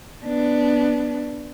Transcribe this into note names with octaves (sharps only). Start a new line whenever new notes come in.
B3 D4